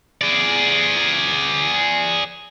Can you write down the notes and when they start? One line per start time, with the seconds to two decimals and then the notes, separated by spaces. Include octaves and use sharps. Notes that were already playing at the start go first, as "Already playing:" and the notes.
0.21 G#4 D5